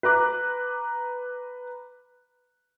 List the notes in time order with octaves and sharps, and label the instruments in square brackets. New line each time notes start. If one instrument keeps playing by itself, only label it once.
[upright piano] B4 A#5 D6 F#6